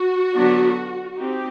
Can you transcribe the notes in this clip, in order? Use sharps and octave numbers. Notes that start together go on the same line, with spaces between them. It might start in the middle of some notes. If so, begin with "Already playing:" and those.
Already playing: F#4
D3 F#3 B3 D4
C4 D#4 G4